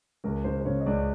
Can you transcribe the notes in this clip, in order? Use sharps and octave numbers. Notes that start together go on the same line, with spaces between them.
C#2 A#4
C#3 C5
C5
C#3 C#5
D#5
C#2 D5